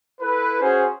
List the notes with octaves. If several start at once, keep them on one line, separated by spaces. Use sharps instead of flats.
E4 A4 B4
C#4 F#4 G#4 C5